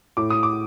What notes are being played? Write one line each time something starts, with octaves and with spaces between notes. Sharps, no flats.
A2 D6
D#6
D6